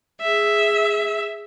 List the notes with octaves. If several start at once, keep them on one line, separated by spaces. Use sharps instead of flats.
G#4 E5